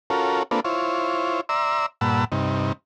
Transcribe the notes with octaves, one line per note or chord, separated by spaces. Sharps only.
C#4 F4 F#4 A4 A#4
A#3 C4 D4 F4 A4 B4
E4 F4 C5 C#5
D5 E5 A#5 C6 E6
G2 A#2 F#5 A5 B5 E6
G2 C3 D#4